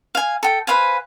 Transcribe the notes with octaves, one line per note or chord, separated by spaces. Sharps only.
F5 G#5
A4 G5
B4 C5 F5 G#5